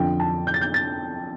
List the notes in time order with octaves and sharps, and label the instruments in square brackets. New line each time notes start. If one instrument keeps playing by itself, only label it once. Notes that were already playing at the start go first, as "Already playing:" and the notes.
Already playing: [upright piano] F2 D3 F3 G5
A5
G6
A6
G6
A6